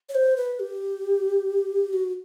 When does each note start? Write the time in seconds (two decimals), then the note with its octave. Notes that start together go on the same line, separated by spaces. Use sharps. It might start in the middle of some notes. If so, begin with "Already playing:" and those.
0.09 C#5
0.15 C5
0.36 B4
0.60 G4
1.93 F#4